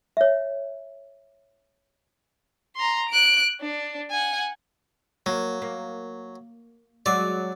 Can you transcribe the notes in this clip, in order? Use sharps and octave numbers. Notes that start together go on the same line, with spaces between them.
C#5 E5
A#5 C6
F#6 D7
D4
F#5 G#5
F#3 A#3
A#3
F#3 G#3 D5